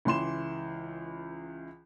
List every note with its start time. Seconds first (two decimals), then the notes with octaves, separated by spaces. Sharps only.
0.05 C#2 E3 C6 E7